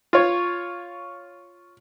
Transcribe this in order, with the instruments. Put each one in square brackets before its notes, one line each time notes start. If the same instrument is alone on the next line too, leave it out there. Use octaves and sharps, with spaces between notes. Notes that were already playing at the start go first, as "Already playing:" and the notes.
[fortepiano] F4 C#5